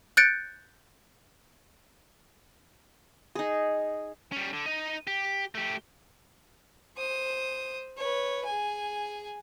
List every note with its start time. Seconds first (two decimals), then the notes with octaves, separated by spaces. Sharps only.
0.17 F#6 G6 A6 C#7 D7
3.35 D#4 G#4
4.32 G3 C#4
4.53 D3
4.66 D#4 D#5
5.07 G4
5.55 A3 G4
6.97 C5 D#6
7.97 B4 C#5
8.45 G#4 G#5